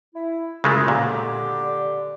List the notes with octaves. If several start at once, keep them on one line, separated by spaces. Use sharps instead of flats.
E4
F#2 C#3 G#3 A3 F4
A#2 D3 G4